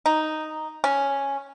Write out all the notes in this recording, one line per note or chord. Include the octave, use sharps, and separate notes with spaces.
D#4
C#4